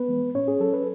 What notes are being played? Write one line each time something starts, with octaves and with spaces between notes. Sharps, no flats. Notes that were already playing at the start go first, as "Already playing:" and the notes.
Already playing: B3 B4
E3 G#3
A2 C#4 C#5
G#4
F#3 A4
B4